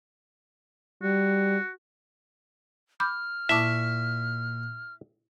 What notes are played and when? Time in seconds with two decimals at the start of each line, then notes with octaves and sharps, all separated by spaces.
1.03 G3 F#4
3.00 B5 D6 F6 G6
3.49 A#2 E4 E5 A5 C#6 D6